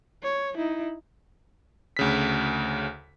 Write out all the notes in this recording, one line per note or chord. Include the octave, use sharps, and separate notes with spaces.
C#5
D#4 E4
D2 C#3 B6